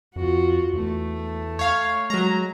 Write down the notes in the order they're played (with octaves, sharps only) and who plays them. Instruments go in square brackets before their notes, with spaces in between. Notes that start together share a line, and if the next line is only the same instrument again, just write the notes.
[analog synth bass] F2 [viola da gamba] F4 F#4
[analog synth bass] E2 [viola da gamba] A3
[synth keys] C#5 F5
[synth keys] F#3 A#5 [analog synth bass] G#3